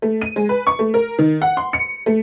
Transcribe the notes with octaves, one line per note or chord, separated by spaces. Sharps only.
A3
D#7
G#3
B4
C#6
A3
A#4
D#3
F#5
C6
C#7
A3